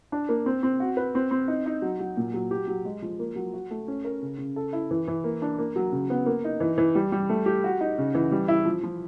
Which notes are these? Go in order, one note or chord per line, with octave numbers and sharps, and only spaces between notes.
D4
A#3
C4
C4
F#4
B4
C4
C4
D#4
D#4
F#3
F#3
A#2
F#3
G4
F#3
G#3
F3
A#3
F#3
F#4
A3
C#4
A#4
C#3
C#3
A4
E4
E3
E3
A#3
D4
A#3
F#3
C#3
B3
A#3
D#4
E3
E3
G3
G3
A3
G4
F#4
D#4
C#3
E3
G3
E4
F3
F3